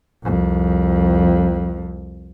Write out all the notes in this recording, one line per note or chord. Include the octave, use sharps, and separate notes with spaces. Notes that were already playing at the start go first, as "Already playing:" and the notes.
C2 F2